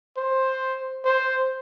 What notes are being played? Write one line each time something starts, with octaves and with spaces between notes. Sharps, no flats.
C5
C5